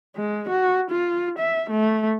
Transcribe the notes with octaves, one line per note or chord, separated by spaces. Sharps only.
G#3
F#4
F4
E5
A3